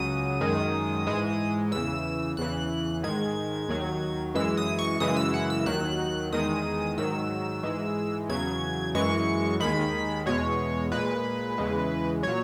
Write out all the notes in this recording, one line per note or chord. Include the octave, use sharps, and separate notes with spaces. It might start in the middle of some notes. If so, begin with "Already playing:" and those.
Already playing: C#2 C#3 F#3 D#6
F#2 D#3 G#3
G#2 E3 G#3
E2 C#3 E3 E6
E2 C#3 E3 F#6
G#2 D#3 G#3 G#6
D#2 D#3 F#3
F#2 E3 G#3 E6
D#6
C#6
F#2 C#3 E3 G#3 D#6
E6
F#5
E6
D#2 D#3 F#3 F#6
E2 D#3 G#3 D#6
G#2 D#3 F#3 E6
G#2 E3 G#3
E2 C#3 F#3 G#6
F#2 E3 G#3 C#6
D#2 D#3 G#3 B5
E2 B2 G#3 C#5
A#2 G#3 B4
E2 C#3 E3 G#3
A#2 F#3 C#5